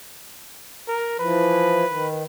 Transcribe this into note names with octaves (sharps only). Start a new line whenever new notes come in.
A#4
E3 F3 B4
D#3